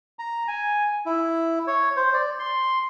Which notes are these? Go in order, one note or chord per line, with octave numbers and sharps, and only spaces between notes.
A#5
G#5
E4
C#5
C5
D5
C6